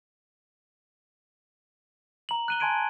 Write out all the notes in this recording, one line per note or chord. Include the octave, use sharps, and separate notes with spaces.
A#5 F#7
F#6 D#7 G7
G#5 A5 C6 G#6 D7 D#7